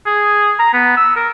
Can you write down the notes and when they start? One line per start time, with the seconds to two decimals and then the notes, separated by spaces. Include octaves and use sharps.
0.06 G#4
0.59 A#5
0.73 B3
0.97 E6
1.16 A#4